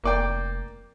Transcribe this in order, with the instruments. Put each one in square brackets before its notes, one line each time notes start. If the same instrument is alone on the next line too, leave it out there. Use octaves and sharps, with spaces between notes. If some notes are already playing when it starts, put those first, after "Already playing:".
[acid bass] F1 [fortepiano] A#3 D5 G5